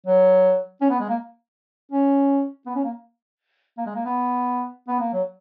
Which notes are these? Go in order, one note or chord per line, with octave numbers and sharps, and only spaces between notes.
F#3
C#4
B3
G#3
A#3
C#4
B3
C#4
A#3
A#3
G#3
A#3
B3
B3
A#3
F#3